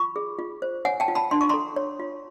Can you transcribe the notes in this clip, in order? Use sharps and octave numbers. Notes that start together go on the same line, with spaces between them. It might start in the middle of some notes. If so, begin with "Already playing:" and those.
Already playing: F4 B5 C#6
G#4
F4
C5
C#5 F#5 G#5
G5 A5
F4
A5 B5
D4 C6
C#6
A4 A#5 C6
C#5
F4